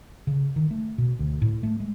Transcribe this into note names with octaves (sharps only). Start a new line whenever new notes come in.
C#3
D#3
A3
B2
D2
A2
A3
G#3